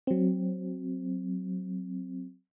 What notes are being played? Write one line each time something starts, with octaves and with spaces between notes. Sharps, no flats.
F#3 C4